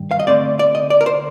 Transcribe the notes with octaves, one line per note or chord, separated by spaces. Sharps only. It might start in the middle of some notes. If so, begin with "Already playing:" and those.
Already playing: G2 D#3
F5
D#5
D3 A3 C4 D5
D5
D#5
D5
A#4
C5